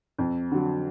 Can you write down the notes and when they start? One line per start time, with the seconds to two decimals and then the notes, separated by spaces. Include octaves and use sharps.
0.18 F2
0.52 D3 F#3